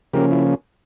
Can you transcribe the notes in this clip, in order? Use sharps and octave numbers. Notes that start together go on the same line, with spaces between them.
C#3 F3 A#3 C#4 G4 A#4
E4